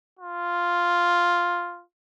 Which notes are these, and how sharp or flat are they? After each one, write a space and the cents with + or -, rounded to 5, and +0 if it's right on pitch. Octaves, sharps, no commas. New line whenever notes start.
F4 +0